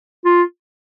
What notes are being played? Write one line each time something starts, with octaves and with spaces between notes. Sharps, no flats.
F4